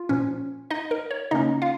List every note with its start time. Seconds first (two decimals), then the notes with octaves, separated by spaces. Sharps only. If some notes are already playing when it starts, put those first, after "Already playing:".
Already playing: F4
0.09 A#2 F3 C#4
0.70 D#4 D#5
0.91 A#4
1.11 C#5
1.31 C#3 A#3 C#4 D#4 D#5
1.62 F4 F5